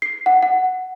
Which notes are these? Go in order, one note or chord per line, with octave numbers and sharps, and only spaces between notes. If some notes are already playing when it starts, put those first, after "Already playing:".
C7
F#5
F#5